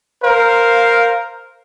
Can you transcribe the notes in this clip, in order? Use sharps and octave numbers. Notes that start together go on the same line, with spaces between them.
A#4 C5 F5